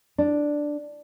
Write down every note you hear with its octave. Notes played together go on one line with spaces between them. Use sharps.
D4